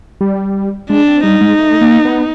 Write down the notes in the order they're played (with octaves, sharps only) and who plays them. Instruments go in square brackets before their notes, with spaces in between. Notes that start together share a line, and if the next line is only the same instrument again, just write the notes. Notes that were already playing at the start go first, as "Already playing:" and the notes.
[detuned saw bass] G3
[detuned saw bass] G#3 [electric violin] D4
[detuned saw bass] C4
[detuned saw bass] G3 [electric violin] D#4
[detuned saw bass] G#3
A3
A#3
B3